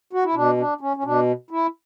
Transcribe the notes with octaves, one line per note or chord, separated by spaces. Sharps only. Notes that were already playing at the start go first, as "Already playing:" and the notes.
F#4
E4
B2 D4
D4
C#4
C#4
B2 D4
E4